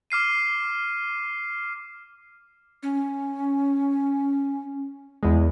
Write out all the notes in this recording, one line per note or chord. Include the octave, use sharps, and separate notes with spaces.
D6 F6 C7 D#7
C#4
E2 G#3